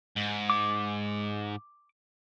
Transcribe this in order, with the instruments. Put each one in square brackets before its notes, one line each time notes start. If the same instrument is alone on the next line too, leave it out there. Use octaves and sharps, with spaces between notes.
[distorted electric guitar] G#2
[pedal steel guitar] D6